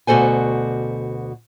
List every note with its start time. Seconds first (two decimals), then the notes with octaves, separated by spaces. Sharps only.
0.07 D2 B2 F#4 A4 C5 G#5